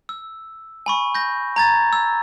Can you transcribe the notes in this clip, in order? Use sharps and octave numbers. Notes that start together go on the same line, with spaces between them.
E6
G#5 B5 C#6
G6 A#6
A#5 G#6 A6
E6